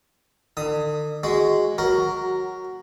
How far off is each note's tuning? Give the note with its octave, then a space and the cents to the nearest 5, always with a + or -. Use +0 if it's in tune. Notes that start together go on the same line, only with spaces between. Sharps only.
D3 +40 D#6 +15
G#3 +0 F#4 +0
F#3 +0 F#4 +10 A#4 +0